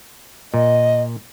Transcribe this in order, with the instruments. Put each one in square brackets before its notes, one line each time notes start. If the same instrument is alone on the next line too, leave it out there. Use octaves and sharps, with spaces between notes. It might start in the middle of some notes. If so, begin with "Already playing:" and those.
[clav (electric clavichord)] A#2 [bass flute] D#5